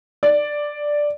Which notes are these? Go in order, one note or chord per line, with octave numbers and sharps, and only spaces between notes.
D5